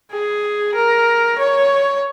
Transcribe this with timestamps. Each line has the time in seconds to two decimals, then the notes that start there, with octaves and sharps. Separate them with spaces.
0.12 G#4
0.74 A#4
1.39 C#5